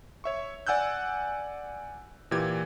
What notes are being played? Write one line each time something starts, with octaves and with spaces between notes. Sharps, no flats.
C#5 E5 C#6
D5 F#5 G#5 E6 F#6 G6
A#2 E3 G4 G#6